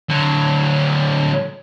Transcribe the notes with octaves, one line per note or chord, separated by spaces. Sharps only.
D3 F#3